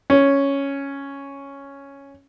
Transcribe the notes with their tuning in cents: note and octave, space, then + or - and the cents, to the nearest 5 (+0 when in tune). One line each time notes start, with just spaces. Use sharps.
C#4 +0